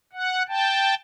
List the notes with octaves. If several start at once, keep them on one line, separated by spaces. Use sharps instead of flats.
F#5
G5 A5